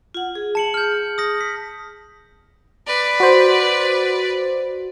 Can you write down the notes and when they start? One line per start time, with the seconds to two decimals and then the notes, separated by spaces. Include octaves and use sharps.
0.14 F4 F#5
0.35 G#4
0.55 A5 C#7 F#7
0.74 F6 G6
1.18 D#6 A#6
1.41 B6
2.87 B4 D5
3.20 F#4 C5